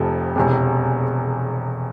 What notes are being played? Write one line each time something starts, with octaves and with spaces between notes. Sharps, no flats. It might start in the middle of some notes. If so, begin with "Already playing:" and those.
Already playing: F1 F2 C3 F3
E1 E2 C3